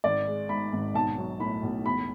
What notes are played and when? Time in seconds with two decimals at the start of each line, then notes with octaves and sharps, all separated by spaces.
0.04 G#1 D5
0.27 G#3
0.49 G#2 B5
0.72 G#1
0.94 B1 A5
1.18 F#3
1.40 A2 B5
1.63 B1
1.86 E1 B5